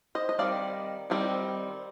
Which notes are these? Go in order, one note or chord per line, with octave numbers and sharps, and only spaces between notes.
C5 D#5
D#5
D#3 G3 C4 D5 F5
D#3 G3 C4